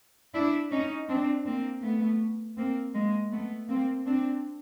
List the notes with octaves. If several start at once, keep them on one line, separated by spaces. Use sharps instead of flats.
D4 E4
C#4 D#4
C4 D4
A#3 C4
A3 B3
A#3 C4
G#3 A#3
A3 B3
A#3 C4
C4 D4